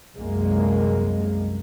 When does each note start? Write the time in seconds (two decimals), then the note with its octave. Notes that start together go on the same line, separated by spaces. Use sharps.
0.17 C2 F#2 G#3 A#3